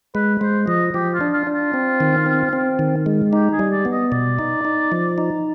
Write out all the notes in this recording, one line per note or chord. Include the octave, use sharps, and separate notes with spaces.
G#3 B4
G#3 C5
F3 D#5
F3 G4
F4
D4
F4
D4
F4
C4
D#3
C4
C4
D#3
G#3
D#4 G4
G#4
G3
D5
B3
D#5
B2 D5
D#4
D#4
F3
D#4